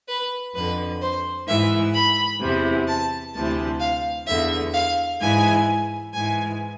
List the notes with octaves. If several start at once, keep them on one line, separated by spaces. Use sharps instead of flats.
B4
F2 D3 B4
C5
G#2 E3 E5
B5
E2 C3 E3
A5
D2 C3 E3 A5
F5
E2 D3 E5
F5
G#2 E3 G#5
G#2 E3 G#5